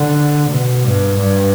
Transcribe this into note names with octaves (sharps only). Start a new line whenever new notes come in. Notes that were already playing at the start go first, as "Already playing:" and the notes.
Already playing: D3
B2
G2
G2